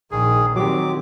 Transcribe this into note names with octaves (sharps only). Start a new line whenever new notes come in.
A#1 D#3 G#4
D#3 F#3 C4 G4 D6